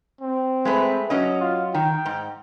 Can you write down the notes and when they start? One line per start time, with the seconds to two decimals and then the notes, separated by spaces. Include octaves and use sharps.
0.21 C4
0.65 G#3 A3 B4
1.10 F#3 C#4 D#5
1.41 F4
1.74 D#3 G5
2.06 G#2